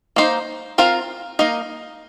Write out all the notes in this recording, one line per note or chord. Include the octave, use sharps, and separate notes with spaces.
A#3 D#4 C5
C4 F4 A#4 F5
A#3 D#4 A#4 D#5